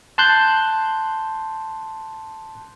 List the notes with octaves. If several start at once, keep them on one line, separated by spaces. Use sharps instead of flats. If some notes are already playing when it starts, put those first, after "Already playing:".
A5 C6 F#6 G6